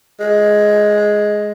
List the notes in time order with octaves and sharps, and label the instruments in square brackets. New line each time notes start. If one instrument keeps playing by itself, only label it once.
[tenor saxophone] G#3